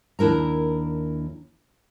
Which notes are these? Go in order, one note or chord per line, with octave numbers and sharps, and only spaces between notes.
D#2 D4 E4 A#4 A#5